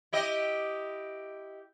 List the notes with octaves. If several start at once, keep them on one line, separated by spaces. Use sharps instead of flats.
E4 G4 D#5